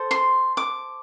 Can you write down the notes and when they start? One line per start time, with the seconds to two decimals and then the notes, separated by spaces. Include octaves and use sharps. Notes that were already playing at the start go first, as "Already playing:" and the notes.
Already playing: A4 C5
0.11 C6
0.57 D6